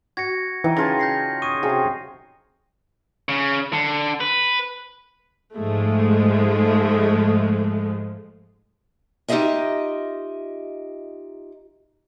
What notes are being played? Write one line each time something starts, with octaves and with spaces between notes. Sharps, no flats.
F#4 G#6 A#6 C#7
E3 D#4 G5
C#3 F4 A5 A#6
G6 A#6 C7
C#6 D#6 D#7
C3 F#4 G#4 F5
C#3
D3
B4
G#2 F3 G#3 A3
D#4 F4 G4 G#4 D#5 E5